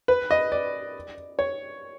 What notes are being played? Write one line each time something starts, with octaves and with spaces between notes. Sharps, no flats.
B4
D#5
D5
C#5